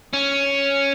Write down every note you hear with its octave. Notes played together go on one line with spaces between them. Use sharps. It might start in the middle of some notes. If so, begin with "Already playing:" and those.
C#4